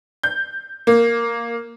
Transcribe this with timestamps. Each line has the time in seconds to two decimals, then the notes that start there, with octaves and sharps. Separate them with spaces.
0.23 G6
0.87 A#3